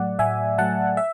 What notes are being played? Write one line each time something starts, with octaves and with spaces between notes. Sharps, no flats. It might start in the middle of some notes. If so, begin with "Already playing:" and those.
Already playing: A2 F#3 A3 D5 F#5
A2 E5 G#5
F#3 A3 F#5 A5
E5